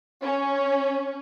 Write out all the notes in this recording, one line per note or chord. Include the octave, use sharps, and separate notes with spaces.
C#4